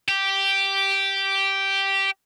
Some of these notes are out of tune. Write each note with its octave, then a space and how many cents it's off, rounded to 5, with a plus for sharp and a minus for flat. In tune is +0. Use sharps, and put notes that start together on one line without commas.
G4 -5